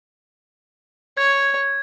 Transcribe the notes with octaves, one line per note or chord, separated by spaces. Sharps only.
C#5 G#6